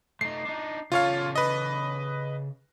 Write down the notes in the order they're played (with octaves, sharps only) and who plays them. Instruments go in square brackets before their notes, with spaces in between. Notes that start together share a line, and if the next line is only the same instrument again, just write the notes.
[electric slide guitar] A3 D#4 [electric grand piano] C7
[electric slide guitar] D4 D#4
[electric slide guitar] C#3 A4 [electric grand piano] F4 C#5 F5
[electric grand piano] B4 D#5